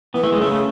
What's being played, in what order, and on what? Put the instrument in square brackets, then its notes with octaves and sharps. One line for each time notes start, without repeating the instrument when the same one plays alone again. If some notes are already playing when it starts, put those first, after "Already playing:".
[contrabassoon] E3 [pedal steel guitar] B3
[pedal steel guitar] A3
G#3
[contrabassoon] C#3 [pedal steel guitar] A3
[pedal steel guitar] A3